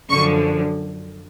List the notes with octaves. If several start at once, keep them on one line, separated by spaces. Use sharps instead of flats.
F#2 D3 F3 C#6